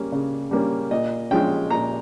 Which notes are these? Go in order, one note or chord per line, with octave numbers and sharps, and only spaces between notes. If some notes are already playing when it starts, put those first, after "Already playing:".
Already playing: G3 A#3 C#4
C#3
G3 A#3 C#4
A#2 D#5
F3 G#3 C#4 G5
A#2 A#5